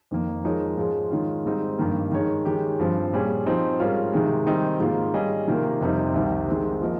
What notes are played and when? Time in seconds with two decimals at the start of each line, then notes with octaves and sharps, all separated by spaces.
0.11 F2 D#3 A#3
0.44 F3 G#3 D#4 A#4 C#5
0.77 G#2 F3 G#3 C#4
1.11 D#3 G#3 C#4 F4
1.45 G#2 G3 C4 D#4
1.78 G2 D#3 A#3
2.12 D#3 G#3 D#4 A#4 C#5
2.45 D#3 G#3 C#4 G4
2.79 G2 F3 C4
3.13 A#2 G3 C#4 G#4
3.46 F3 C4 D#4
3.80 G#2 G3 C#4 F4 A#4
4.13 C3 D#3 G#3
4.47 D#3 G3 C4 D#4
4.80 G#2 D#3 A#3 F4
5.13 G3 C#4 G#4 D#5
5.47 C3 D#3 A#3 F4 A#4
5.81 F2 C3 G3 C4 D#4
6.14 C2 C3 D#3 G3
6.48 D#3 G#3 C4
6.81 F3 A#3 F4 A#4 D#5